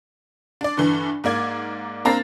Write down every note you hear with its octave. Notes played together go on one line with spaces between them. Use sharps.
D4 D5
G2 D3 E3
G#2 A#3 D5 G#6
A#3 C4 D4 A#5 A6 C7